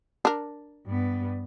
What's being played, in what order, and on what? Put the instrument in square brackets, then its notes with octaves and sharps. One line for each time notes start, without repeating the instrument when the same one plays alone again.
[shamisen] D4 A#4
[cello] G2 B3